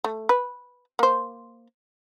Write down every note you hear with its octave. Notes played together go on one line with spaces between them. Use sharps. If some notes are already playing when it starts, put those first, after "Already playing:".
A3
B4
A#3 C5